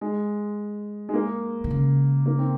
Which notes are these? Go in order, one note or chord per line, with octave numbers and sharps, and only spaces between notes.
G#3
G#3
A#3
D#3
C#3
A#3
C4